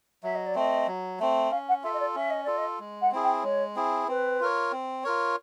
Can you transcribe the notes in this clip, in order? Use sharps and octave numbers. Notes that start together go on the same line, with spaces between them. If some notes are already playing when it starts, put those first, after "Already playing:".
F#3 E5
D#5
D5
A3 C4 D#5
F#3
A3 C4
C#4 F5
F#5
F4 A4 E5
D#5
D5
C#4 E5
D#5
F4 A4 D5
D#5
G#3
F#5
C4 E4 G#4
G5
G#3 C#5
C4 E4 G#4
C4 B4
F4 A#4 C#5
C4
F4 A#4 C#5